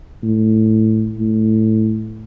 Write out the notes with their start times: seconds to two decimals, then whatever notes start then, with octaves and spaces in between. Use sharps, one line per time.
0.23 A2
1.18 A2